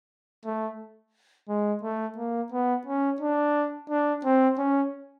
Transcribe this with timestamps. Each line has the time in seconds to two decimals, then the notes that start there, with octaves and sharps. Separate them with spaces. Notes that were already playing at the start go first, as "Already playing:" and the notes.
0.45 A3
1.49 G#3
1.83 A3
2.17 A#3
2.52 B3
2.86 C#4
3.21 D4
3.90 D4
4.25 C4
4.58 C#4